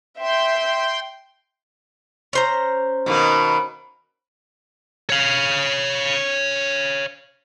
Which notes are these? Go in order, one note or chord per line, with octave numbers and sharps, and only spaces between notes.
E5 G5 C6
C#4 C5 A#5
B2 D#3 A#3
C#5 F5